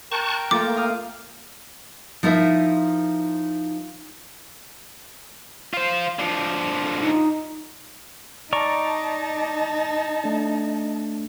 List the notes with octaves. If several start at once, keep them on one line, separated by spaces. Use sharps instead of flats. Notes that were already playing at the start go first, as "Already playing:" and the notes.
A#4 G5 A5 C#6 F#6
A3 A#3 F4 D6 A6
F5 D#6 F6
F3 D#4 E4 A#4 E5
F4 C5
D3 F3
D#4
D#4 D5 A5 A#5 C#6
A3 D4